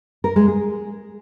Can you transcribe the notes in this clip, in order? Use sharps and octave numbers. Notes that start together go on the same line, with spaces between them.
A#4
G#3
G#4